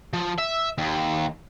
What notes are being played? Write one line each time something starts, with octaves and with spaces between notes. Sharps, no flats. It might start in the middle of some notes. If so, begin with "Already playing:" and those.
F3
E5
D#2